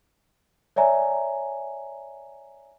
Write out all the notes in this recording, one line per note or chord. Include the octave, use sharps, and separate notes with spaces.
C#5 D5 E5 G#5 A#5